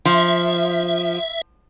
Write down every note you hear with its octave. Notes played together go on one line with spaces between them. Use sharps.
F3 E5